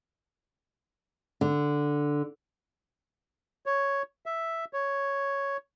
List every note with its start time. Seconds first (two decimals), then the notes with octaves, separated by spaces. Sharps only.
1.41 D3
3.66 C#5
4.26 E5
4.73 C#5